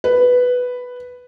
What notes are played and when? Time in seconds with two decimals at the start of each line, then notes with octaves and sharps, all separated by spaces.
0.04 B4